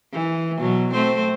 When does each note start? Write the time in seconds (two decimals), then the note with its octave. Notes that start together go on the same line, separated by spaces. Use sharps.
0.13 E3
0.60 B2 F#3
0.92 A3 C4 C5